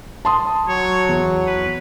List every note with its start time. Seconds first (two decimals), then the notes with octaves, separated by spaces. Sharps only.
0.25 A5 C6 D#6
0.68 F#3 C#5
1.09 E2
1.47 B4